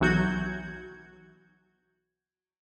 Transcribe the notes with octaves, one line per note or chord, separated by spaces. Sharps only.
B1 E3 F#3 F#4 G6 G#6